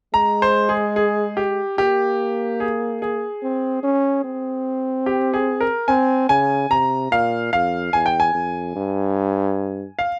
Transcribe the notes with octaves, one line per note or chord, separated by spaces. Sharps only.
G#3 A#5
C5
G#4
G#4
G4
A#3 G4
G#4
G#4
C4
C#4
C4
G4
G#4
A#4
C4 G#5
C#3 G#5
C3 A#5
A#2 F5
F2 F5
E2 G#5
G5
G#5
F2
G2
F5